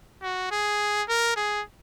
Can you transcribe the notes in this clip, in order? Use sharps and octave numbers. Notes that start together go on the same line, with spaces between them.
F#4
G#4
A#4
G#4